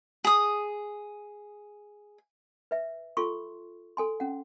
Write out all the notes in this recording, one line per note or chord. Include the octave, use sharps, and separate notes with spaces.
G#4 D#6
B4 E5
F4 G#4 A4 C6 C#6
A4 G#5 C6
C#4 F#5